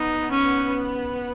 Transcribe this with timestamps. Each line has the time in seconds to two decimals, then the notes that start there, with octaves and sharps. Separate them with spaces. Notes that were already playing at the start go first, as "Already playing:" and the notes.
Already playing: B3 D#4
0.31 C#4